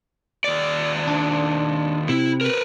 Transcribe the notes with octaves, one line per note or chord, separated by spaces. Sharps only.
D#2 D5
D4
C3 E4
A#4 B4